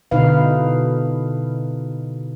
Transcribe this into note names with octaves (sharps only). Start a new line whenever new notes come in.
B2 D3 D#4 E4 B4 F5